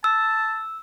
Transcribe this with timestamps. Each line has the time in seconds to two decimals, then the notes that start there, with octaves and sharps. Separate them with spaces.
0.04 A5 E6